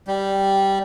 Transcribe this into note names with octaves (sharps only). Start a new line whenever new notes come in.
G3